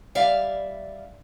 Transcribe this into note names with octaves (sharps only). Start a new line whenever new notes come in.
G3 D5 E5 F5